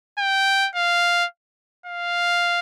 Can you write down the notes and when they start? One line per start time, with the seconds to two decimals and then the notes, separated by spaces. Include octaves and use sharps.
0.18 G5
0.75 F5
1.86 F5